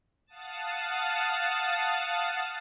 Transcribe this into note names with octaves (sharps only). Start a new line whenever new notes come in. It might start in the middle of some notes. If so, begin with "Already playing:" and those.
F5 F#5 A5 D#6 A6 E7